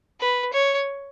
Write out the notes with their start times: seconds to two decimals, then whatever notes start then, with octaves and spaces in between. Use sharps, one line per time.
0.20 B4
0.53 C#5